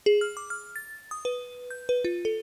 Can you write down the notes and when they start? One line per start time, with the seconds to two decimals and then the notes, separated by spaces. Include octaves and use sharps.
0.06 G#4
0.21 F6
0.37 D6
0.50 F6
0.76 A6
1.11 D#6
1.25 B4
1.70 G6
1.89 B4
2.05 F4
2.25 A4